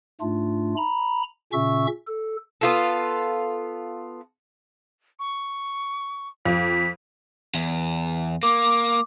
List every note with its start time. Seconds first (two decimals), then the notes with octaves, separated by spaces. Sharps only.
0.21 G#2 A3 D4 F4
0.77 A#5 B5
1.53 A#2 C#3 C#4 E5 C#6 E6
2.07 A4
2.61 B3 F4 A4
5.19 C#6
6.45 F2 B6
7.55 E2
8.43 A#3 D6